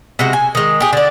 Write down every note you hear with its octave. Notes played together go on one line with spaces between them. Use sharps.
C3 G#3 F#4
G#5
D#3 G#3
G4 G#4
D3 D5